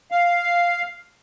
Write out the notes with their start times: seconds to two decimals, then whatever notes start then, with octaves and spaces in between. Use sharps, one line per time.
0.11 F5